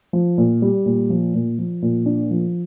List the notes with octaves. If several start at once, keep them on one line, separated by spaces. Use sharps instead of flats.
F3
A#2
G3
A#2
F3
A#2
F3
A#2
D4
F3